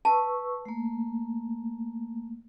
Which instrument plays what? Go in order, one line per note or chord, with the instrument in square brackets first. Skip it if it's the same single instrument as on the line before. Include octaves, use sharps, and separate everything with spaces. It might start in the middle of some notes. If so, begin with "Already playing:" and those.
[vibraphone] B4 C#6 E6 [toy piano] A5
[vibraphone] A3 A#3